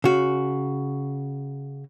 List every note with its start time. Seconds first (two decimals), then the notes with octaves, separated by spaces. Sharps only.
0.04 C#3 F#4